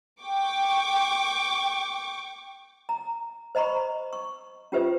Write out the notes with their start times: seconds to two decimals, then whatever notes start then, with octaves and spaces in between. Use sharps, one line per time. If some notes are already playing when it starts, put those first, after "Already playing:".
0.22 G5 C#6 D6
2.89 A#5
3.55 C5 D#5 A#5 B5 C#6
4.13 C#6
4.72 C#4 F4 G4 B4 C5 E5